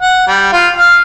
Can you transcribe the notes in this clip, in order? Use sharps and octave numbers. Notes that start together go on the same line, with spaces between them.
F#5
G3
F4
F5